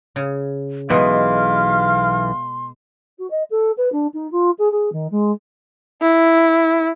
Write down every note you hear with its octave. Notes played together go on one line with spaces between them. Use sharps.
C#3
B1 B2 E3 G#3 F5 C6
F#4
D#5
A4
B4
D4
D#4
F4
G#4
G#4
D#3
G#3
E4